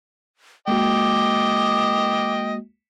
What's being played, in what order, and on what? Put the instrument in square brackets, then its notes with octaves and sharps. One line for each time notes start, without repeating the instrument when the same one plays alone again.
[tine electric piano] G#3 A#3 F#4 [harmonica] D#5 G5 [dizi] D6